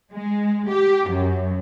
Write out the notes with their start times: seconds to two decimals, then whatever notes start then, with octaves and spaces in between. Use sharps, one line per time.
0.12 G#3
0.68 G4
1.09 F#2